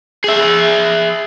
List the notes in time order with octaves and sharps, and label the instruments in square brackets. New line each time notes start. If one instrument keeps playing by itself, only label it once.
[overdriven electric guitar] G#4 E5